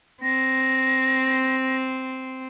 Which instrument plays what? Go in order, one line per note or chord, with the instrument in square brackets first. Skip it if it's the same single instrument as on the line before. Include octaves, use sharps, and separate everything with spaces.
[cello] C4 [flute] A#6